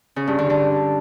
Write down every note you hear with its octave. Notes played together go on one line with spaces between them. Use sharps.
C#3
G2
D3
D3